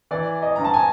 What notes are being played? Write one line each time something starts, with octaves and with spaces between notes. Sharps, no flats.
E3 D5
D#5
G2 A#5
A5
G#5